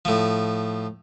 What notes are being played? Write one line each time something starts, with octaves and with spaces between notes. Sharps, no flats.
A2 F3